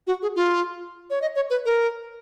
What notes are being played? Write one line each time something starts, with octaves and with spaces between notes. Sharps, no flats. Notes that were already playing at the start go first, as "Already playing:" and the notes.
F#4
G#4
F4
C#5
D#5
C#5
B4
A#4